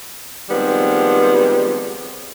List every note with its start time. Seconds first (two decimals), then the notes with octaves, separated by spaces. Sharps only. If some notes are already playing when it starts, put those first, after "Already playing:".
0.50 D#3 F3 G3 G#3 B3 C4